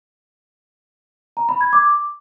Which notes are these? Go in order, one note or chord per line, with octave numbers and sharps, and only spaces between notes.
A#5
B5
G#6
D6